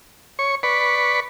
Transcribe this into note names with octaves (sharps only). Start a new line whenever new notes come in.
C#5 C#6
B4 D5 B5 C#6